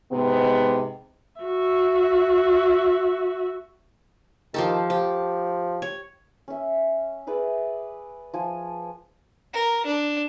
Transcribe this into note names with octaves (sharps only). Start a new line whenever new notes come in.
G#2 C3 B3
F#4 E5
D#3 F3 G4 A4
F3 G4
C#5
C#4 E5
G#4 B4 D5 E5
F3 G#5
A#4
D4